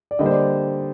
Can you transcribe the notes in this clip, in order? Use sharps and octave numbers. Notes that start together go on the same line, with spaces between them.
D5
D3 G3 A#3 D#5
C5
D5